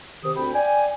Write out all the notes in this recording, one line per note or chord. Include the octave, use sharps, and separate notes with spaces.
C3 D#3 G4 D#6
D2 C4 G5 B5
D5 G5 G#5